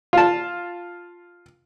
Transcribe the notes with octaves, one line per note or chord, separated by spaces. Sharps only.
F4 A5